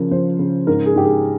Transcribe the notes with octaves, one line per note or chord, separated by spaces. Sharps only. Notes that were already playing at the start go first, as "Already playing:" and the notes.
Already playing: C#3 F3 A#4
F3 C5
C#3
G#2 A#4
G#4
G#2 G4
G#4